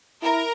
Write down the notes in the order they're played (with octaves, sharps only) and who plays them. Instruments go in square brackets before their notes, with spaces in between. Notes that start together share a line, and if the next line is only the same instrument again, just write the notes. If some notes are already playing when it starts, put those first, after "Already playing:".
[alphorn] E4 [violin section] A#4